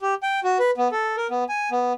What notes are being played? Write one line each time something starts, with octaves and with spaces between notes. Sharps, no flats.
G4
G5
F#4
B4
B3
A4
A#4
B3
G#5
B3